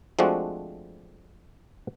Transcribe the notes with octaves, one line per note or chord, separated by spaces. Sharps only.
F3 G#3 A3 C4 D4 F#4